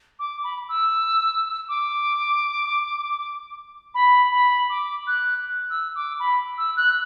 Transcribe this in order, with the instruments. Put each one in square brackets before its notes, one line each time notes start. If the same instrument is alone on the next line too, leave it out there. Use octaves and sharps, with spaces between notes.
[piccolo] D6
B5
E6
D6
B5
B5
D6
F#6
E6
D6
B5
E6
F#6